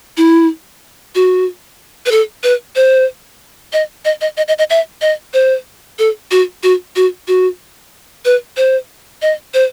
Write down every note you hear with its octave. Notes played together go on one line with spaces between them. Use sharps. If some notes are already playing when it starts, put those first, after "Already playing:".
E4
F#4
B4
A4
B4
C5
D#5
D#5
D#5
D#5
D#5
D#5
E5
D#5
C5
A4
F#4
F#4
F#4
F#4
B4
C5
D#5
C5